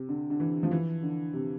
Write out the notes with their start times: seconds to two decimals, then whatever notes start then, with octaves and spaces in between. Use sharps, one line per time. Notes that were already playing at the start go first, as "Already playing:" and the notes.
Already playing: C3
0.09 D3
0.30 D3
0.40 E3
0.63 F3
0.71 E3
1.03 D3
1.33 C3